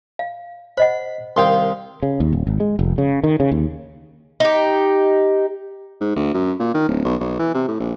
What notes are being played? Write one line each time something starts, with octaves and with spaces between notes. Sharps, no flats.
F5
C5 D#5 F#5 B5
C2 D#3 F5 G5 C6
C#3
D#2
D#1
G#1
G#3
F1
C#3
D#3
C#3
D#2
D#4 G4
G#2
D2
F#2
A#2
D#3
D1
B1
B1
E3
C3
A2
A#1